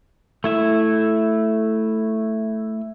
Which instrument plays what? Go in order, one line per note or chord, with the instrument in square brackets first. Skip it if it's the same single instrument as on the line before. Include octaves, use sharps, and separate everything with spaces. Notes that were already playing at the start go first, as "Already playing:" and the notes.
[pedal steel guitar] A3 E4 E5